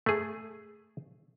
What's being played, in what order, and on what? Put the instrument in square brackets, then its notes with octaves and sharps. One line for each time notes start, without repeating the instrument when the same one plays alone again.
[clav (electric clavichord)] A3 G#4